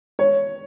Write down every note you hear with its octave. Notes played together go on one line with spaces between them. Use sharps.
C#5